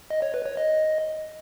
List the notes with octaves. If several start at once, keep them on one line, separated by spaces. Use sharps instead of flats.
D#5
C#5
B4
C#5
D#5